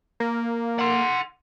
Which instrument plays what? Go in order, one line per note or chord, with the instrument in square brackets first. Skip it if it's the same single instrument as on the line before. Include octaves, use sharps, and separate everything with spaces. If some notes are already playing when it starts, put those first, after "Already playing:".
[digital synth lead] A#3
[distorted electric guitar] F#5 C6